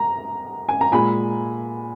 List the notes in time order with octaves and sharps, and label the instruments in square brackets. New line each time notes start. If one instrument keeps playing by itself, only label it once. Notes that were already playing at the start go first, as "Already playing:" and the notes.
Already playing: [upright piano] A#5
G#5
A#5
A#2 G#3 G#5 B5